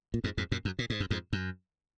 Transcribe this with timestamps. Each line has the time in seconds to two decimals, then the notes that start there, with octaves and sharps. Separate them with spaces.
0.14 A#2
0.24 F2 G#2
0.37 F2 G#2
0.51 F#2 A#2
0.65 F#2
0.79 A#2
0.90 G#2
1.00 F#2
1.10 F2 G#2
1.33 F#2